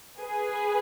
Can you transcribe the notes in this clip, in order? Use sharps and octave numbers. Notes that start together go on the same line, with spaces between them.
G#4 B4